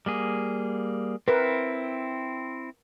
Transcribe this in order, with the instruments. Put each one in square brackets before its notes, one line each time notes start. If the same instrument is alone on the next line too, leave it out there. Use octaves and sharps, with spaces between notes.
[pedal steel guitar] G3 A#3 G#4
[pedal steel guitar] C4 E4 [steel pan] A#4 B4